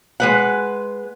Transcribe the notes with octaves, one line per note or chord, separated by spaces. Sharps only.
G#3 B4 F#5